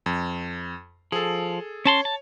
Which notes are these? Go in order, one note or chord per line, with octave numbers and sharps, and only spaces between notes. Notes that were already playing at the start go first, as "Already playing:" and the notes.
F2
F3 G#4 A4
C#4 C#5 A5 C6
A5